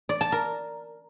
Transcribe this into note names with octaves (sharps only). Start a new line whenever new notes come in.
D5
A5
A#4